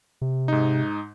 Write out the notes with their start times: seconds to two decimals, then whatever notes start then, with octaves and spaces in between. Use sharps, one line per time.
0.21 C3
0.48 G#2 D#4